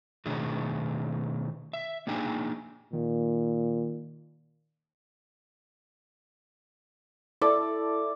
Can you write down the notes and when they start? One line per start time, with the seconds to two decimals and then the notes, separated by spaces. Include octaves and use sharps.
0.26 B2 D#3 A3 D4 F#4 G#4
1.73 E5
2.07 A#3 D4 D#4 G#4 G5 G#5
2.93 A#2 D#3
7.42 E4 A4 D5